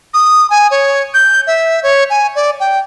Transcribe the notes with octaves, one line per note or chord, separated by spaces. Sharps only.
D#6
G#5
C#5
G6
E5
C#5
G#5
D5
G5